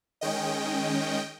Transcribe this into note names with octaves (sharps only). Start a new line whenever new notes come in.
D#3 G#3 C#4 D#5 G5